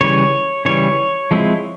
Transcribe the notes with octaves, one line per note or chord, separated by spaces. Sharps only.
C#3 E3 G3 C#5
C#3 E3 G3 C#5
F3 G#3 C4 E4